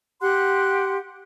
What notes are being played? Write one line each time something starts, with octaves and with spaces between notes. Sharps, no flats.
G4 F#5 C6 F#6